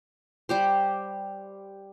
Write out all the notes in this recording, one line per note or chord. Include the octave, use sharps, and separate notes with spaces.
G3 G4 C5